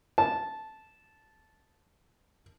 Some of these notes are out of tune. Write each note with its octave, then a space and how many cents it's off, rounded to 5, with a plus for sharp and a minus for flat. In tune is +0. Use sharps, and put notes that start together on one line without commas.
A5 -10